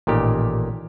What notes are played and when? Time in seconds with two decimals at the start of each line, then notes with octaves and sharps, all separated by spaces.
0.07 A1 A#2 D#3 G4